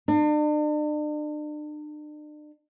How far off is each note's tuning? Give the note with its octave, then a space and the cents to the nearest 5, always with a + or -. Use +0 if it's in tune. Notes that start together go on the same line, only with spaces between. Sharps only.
D4 +40